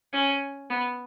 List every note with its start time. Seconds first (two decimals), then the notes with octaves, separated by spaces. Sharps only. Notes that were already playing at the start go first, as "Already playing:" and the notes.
0.13 C#4
0.70 B3